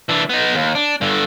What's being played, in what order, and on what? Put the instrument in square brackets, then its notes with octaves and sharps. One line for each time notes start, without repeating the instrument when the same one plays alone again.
[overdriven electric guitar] E3 D4
B3 D#4
D#2
D4
G2 D3